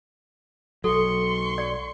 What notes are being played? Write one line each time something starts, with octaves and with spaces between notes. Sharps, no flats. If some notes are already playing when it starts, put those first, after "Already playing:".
B1 F#3 A4 C6 C#6
D5